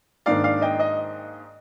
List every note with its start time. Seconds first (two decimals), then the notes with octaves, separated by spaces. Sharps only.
0.26 G#2 D#3 A#3 D4 D5 F5
0.44 D5 F5
0.61 D#5 G5
0.79 D#5